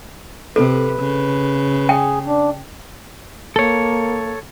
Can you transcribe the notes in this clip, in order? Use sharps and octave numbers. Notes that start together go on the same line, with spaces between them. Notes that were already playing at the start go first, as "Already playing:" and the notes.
C3 A4 B4
C#3
G#4 G5
D4
A#3 A4 C#5